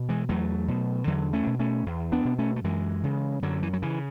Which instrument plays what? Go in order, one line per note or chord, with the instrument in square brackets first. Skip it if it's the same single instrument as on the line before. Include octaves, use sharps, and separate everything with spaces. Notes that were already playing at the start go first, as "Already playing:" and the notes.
Already playing: [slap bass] B2
E3 G#3
E2 F#3 A3
B2
E2 D3 F#3
A3 C#4
B2
A3 C#4
E2
B3 D4
B2
A3 C#4
A3
F#2 E3 G#3
C#3
F#2 D3 F#3
E3
F#3
C#3 E3